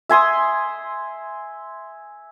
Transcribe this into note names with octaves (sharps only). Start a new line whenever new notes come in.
E5 G#5 C6 D#6